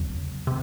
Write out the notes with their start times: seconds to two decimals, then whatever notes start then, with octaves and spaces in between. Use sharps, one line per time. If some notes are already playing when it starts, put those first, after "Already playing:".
Already playing: E2 C#3 F#3
0.47 C3